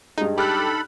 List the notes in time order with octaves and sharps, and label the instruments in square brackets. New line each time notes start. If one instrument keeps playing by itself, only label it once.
[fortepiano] G2 G#3 [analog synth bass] D#4
[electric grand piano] G4 F6 F#6 [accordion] A4 B5